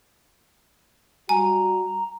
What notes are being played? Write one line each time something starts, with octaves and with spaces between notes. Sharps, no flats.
G3 F#4 G#5 A#5